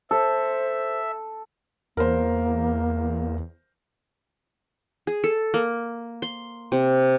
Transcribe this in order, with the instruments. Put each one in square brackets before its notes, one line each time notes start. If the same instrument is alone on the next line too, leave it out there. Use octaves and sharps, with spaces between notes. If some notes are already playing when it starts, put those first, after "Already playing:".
[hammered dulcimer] A4 [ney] C5 [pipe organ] E5
[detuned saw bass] E2 [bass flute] A#3 [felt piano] A#4 C5
[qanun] G#4
A4
A#3
C6
C3